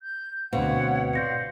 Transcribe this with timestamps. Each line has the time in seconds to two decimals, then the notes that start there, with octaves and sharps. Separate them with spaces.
0.03 G6
0.53 D2 B2 C4 C#5 F5 F#5
1.13 D5 F5 C6 G6 A#6 C#7